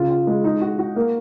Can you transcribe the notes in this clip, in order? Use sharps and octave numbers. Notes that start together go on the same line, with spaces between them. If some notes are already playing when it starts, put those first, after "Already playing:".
Already playing: C#3 F4
F4
G#3
D#4
F#4
F#4
A#3